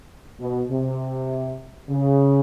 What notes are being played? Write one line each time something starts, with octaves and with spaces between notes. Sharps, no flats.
B2
C3
C#3